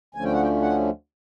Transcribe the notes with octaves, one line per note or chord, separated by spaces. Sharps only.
D2 D3 F3 A3 C#4 G#5
G5
F#5
G5
F#5